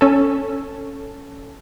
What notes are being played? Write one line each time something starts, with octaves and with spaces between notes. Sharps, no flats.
C#4 A4